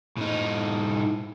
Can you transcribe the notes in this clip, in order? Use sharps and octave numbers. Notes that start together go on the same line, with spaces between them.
A2 D#4